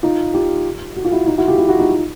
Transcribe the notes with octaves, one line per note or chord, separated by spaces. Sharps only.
D#4 F4
F4 G4
F#4
F4
E4 F#4
D#4 F4
E4 F#4
F4 G4
E4 F#4
E4 F#4
D#4 F4